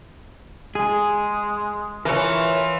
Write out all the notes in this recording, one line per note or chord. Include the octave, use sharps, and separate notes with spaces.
G#3 G#4
E3 F4 A#4 C#5